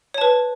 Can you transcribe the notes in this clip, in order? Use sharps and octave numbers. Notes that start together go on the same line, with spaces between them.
B4 C#5 A5